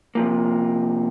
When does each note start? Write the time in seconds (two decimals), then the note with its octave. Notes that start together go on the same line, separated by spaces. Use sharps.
0.15 C3 F3 A#3